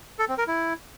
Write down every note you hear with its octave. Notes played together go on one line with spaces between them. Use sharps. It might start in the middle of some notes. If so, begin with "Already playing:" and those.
A4
C4
A#4
E4